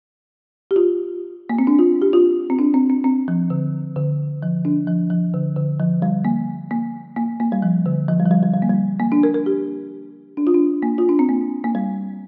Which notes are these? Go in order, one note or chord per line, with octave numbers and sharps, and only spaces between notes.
G4
F4
A#3
C4
D4
F4
G4
F4
C4
D4
C4
C4
C4
F3
D3
D3
F3
D4
F3
F3
D3
D3
F3
G3
A#3
A#3
A#3
A#3
G3
F3
D3
F3
G3
F3
G3
G3
G3
A#3
G3
A#3
D4
A#4
A#4
G4
D4
F4
D4
A#3
F4
D4
C4
A#3
A#3
G3